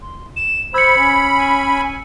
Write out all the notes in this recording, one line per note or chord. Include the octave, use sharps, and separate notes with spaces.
C6
E7
C5 B5 E6 G#6 C#7
C#4
G#5